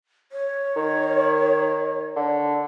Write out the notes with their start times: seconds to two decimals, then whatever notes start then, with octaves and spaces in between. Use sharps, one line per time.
0.32 C#5
0.76 D#3
2.16 D3